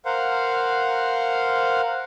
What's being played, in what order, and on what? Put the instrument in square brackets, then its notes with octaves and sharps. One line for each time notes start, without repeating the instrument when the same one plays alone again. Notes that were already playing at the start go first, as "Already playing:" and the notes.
[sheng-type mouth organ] A#4 C5 F5 F#5